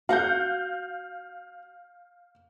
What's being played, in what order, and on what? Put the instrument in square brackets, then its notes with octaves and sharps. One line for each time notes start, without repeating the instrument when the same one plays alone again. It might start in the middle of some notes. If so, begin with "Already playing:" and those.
[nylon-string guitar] F#4 F#5 [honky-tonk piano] F5 G6